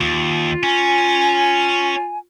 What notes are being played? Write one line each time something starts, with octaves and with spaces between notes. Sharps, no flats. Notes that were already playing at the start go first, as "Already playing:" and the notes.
D#2 F4
C#4 G#5